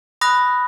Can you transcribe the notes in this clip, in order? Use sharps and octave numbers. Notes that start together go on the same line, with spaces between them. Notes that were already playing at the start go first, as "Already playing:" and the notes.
B5 D#6 F#6 A#6